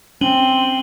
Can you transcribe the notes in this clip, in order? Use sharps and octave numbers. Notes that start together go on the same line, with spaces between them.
C4 C#4 D#7 F#7 G7